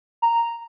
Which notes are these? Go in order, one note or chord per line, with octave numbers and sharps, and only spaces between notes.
A#5